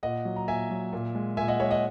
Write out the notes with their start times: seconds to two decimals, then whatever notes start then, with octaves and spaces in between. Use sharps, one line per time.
0.03 A#2 D#5 F#5
0.25 F#3
0.36 A#5
0.47 A#2 E5 G#5
0.71 F#3
0.93 A#2
1.15 G#3
1.37 A#2 E5 G#5
1.48 D#5 F#5
1.59 G#3 C#5 E5
1.71 D#5 F#5